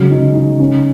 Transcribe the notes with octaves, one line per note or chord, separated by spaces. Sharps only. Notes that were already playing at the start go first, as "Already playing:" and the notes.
Already playing: C#3 F#3 G#3
D#4
D#4
C#4